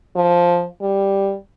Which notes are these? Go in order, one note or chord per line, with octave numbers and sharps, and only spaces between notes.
F3
G3